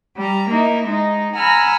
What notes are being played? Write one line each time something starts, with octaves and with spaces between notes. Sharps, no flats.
G3 A#5
A#3 D#4 E4
G#3 D#4
F#5 G#5 A#5 B5 E6 F6